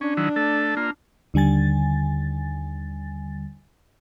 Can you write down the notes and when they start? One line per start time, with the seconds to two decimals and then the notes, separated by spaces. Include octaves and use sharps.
0.01 C#4 D4
0.17 D#3 F#3 E4
0.36 A3 A4
0.77 A#3 F4
1.34 D#2 D3 G3 G#5 A6